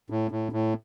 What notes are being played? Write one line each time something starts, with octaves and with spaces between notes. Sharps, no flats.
A2
A2
A2